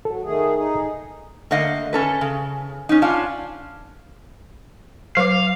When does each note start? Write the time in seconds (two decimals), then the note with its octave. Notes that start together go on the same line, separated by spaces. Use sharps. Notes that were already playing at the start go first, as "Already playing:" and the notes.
0.05 F#3 A4
0.23 D#3 A3 G#4
0.55 D#4 G#4
1.51 D3 A3 A#3 D#5 F5
1.93 C#4 A4 B4
2.21 C#3
2.89 C#4 D#4
3.02 C#4 D4 F4 F5
5.17 F#3 B4 F5 D6